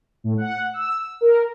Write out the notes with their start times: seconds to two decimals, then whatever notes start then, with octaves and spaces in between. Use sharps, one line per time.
0.24 A2
0.38 F#5
0.73 E6
1.21 A#4